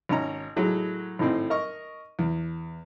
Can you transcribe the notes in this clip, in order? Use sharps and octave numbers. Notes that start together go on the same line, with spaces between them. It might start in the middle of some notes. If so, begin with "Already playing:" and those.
G#1 C#4 A#5
A2 F#3 G#3
G#1 A2 C4
A#4 D#5 C#6
E2